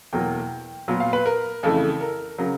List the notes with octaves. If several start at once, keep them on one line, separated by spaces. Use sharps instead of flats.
E2 B2 F#3 A#3 G5
A#2 F#3 B3
F5
B4
A#4
F2 C#3 E3 A3 A4
A#4
C#3 F#3 A#4